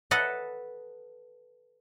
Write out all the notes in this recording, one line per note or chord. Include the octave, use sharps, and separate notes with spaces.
A4 B4 D#5 F#5 A5